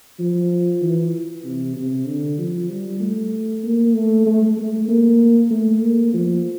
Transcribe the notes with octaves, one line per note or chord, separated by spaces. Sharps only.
F3
E3
C3
C3
D3
F3
G3
A3
A#3
A3
A3
A3
A#3
A3
A#3
F3